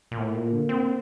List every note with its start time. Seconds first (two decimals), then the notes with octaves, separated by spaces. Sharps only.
0.11 A#2
0.18 A2 A#3
0.35 A#2
0.53 D3
0.69 C4